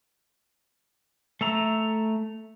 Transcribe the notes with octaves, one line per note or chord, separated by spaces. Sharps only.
A3 E5 A#5